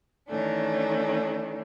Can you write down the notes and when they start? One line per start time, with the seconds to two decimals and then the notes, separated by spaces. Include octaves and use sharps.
0.28 D#3 E3 A3 C#4 D4